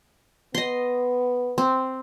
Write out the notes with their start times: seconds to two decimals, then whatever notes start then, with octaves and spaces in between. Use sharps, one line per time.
0.55 B3 D#5 C6
1.58 C4